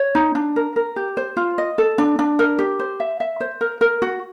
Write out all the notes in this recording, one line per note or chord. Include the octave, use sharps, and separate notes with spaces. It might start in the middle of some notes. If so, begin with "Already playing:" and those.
Already playing: C#5
D#4
D4
A#4
A#4
G4
C5
F4
D#5
A4
D4
D4
A#4
G4
C5
E5
E5
C5
A#4
A#4
F#4